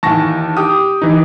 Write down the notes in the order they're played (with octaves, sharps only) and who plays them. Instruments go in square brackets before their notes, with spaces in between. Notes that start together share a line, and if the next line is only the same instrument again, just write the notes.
[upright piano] D#2 E3 [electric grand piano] A5 C#6 A#6
[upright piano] G4 D6 D#6
[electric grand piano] E3 D#4